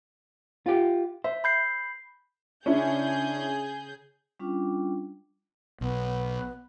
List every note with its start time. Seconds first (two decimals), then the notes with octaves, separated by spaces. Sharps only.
0.66 F4 G4
1.24 C5 E5
1.44 B5 G6 C7
2.66 C#3 C#4 D4 E4 G#4 G6
4.40 G3 C#4 D4 F4 G5 D6
5.81 B1 B3